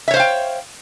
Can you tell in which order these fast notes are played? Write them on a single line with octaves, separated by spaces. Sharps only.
E5 C#5 C5 F5 G5